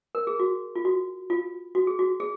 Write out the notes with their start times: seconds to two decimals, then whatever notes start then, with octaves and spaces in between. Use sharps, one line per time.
0.15 A#4
0.27 G#4
0.40 F#4
0.76 F4
0.85 F#4
1.30 F4
1.75 F#4
1.87 G#4
1.99 F#4
2.20 G#4